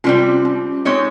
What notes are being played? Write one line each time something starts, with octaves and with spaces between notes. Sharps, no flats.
C3 G3 C4 C#4 F4
C#4
G#3 C4 D#4 G4 C#5